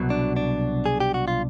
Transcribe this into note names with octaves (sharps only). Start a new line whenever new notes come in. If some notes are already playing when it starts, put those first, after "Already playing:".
Already playing: C2 B2 F#3
D4
D4
G#4
G4
F#4
F4